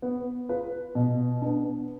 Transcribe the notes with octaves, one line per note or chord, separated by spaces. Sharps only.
B3
F4 B4
B2
B3 D4